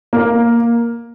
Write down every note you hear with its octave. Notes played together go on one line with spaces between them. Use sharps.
A#3